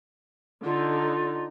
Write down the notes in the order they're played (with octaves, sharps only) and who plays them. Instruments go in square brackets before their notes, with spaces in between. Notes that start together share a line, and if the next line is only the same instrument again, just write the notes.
[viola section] D3 D#4 [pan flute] F4